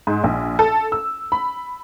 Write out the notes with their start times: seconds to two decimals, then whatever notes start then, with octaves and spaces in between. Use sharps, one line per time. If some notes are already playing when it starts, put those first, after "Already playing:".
0.07 G#2
0.24 A#1
0.59 A4
0.92 E6
1.32 B5